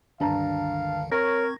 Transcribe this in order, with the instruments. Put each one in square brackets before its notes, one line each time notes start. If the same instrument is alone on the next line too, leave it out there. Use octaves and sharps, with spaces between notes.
[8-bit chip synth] C#2 D3 D#3 [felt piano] G2 A5 A#5 [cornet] F5
[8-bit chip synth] C4 C#6 G#6 [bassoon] A#4 [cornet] C#5 [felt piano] A#6